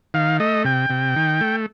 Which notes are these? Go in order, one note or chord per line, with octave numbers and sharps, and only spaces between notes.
D#3 F5
A3 D#5
C3 G5
C3
D#3
A3